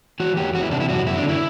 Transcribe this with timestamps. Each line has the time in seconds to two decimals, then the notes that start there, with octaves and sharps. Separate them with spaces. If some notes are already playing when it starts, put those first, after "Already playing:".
0.20 E3 F#4
0.37 E2 G4
0.54 E2 F#4
0.63 E4
0.71 C3 D4
0.80 E4
0.89 F#2 F#4
1.06 F#2 E4
1.17 D4
1.23 D3
1.29 E4